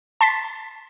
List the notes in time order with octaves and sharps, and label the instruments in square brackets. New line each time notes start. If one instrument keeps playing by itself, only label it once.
[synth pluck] A5 C6 A6 B6